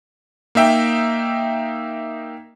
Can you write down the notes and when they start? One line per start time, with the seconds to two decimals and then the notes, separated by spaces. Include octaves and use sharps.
0.55 A#3 D#4 E5 G5